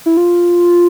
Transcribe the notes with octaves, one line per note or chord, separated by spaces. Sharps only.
E4
F4